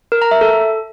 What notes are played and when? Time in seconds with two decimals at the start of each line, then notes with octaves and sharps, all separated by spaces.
0.12 A#4
0.22 A#5
0.31 E5
0.41 A4